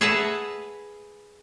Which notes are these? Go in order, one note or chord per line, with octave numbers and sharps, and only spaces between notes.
G#4 B4 E5 F#5 A5 A#5